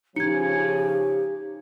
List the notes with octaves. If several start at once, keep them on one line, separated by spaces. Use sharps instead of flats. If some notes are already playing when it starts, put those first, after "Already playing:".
C#3 F3 D#4 G4 G#6 C#7